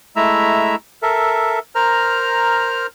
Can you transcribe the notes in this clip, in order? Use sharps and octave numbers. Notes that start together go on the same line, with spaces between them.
G#3 A3 E4 E5 A#5 E6
A4 A#4 E5
A#4 C5 A#5 F6